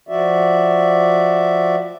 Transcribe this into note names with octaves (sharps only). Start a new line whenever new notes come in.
F3 F#4 D5 E5